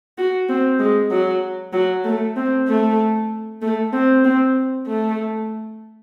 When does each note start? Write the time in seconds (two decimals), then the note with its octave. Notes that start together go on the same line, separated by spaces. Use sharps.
0.18 F#4
0.49 C4
0.79 G#3
1.11 F#3
1.73 F#3
2.04 A3
2.36 C4
2.68 A3
3.62 A3
3.93 C4
4.25 C4
4.87 A3